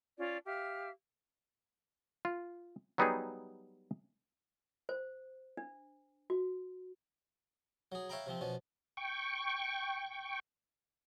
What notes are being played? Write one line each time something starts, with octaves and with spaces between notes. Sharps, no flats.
C#4 F4 D5
G4 E5 F5 F6
F4
F#3 G3 B3 D#4 G4 G#4
C5
D4
F#4
F#3 G#4
C#5 E5 F5 G5 A#5 B5
C3 F3 C4
B2 F3 C#4
G5 C#6